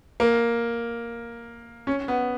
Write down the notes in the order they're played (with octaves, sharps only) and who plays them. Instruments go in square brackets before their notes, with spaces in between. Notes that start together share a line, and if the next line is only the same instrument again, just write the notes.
[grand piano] A#3
C#4
B3